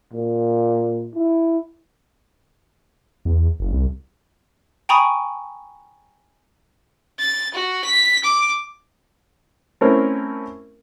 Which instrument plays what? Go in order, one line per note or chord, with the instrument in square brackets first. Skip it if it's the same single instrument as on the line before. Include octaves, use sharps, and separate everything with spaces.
[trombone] A#2
E4
[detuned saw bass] E2
F#1
C2
[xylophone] G5 G#5 A#5 B5 C#6 D#6
[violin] A6
F#4
B6
D6
[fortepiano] A3 C4 C#4 E4 A#4 C5